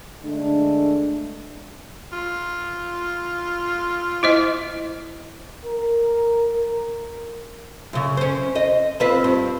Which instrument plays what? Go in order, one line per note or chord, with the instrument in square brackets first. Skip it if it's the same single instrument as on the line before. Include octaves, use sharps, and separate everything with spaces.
[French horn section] D3 G#3 A3 D4
[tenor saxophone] F4
[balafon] E4 C5 D#5
[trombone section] A#4
[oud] F#2 C#3
C4 C#4
D#5
C4 F4 B4
G2